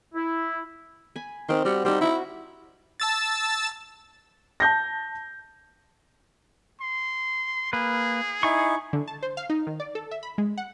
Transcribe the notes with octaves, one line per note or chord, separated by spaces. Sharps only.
E4
G#5 B5
D#3 C4 G5 C6
G3 F#4 F#5
G3 D#4 C5
E4 F#4 E5
A5 E6 A6
A5 G6 A#6
C6
A#3 G#4 B4
D#4 E4 G#5 C#6
D3
A5
C5
F5
D#4
D#3
D5
A4
E5
B5
G#3
F#5